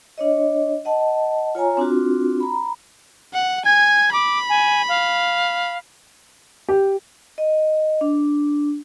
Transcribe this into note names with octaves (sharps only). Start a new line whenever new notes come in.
D4 C#5 D#5
D#5 F#5 A5
F4 C#5 G#5 A#5
C4 D4 F4 F#4
A#5 B5
F#5
G#5 G#6
B5 D6
G#5
F5
G4
D#5
D4